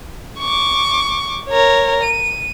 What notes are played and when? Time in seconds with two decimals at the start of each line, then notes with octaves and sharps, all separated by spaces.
0.39 C#6 D6
1.49 A#4 C#5
2.03 D#7